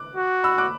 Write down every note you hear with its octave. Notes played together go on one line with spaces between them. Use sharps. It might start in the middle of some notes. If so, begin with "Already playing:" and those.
Already playing: D6 F#6
F#4
B5 E6
D6 F#6